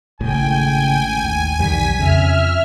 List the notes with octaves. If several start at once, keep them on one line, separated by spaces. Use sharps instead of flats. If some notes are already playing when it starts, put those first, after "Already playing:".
G#1 A2 C#3 G5 G#5
D#2
B1 E2 D#3 G3 B6
F2 C#3 E5 F6